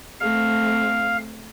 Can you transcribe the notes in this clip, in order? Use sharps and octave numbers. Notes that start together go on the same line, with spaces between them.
A3 C4 F5